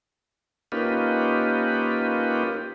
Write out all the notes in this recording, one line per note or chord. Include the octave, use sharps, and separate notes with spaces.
A#3 C#4 D#4 F4 G4 B4